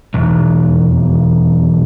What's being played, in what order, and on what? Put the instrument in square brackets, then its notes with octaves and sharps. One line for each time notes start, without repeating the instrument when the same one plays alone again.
[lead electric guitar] B1 E2